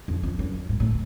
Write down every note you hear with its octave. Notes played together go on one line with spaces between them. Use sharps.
F2
F2
F#2
G#2
A2